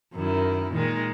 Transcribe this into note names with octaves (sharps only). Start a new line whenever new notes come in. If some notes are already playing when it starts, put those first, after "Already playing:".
F#2 D#3 E4
A#2 D#3 G#3